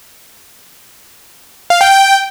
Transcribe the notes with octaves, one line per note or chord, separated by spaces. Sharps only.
F5
G5
G5